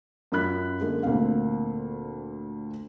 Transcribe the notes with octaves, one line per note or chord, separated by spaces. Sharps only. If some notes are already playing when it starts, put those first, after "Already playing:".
F#2 F4 B5 F#6 B6
D3 G#3 A#3
D2 A#2 A#3 C4 F5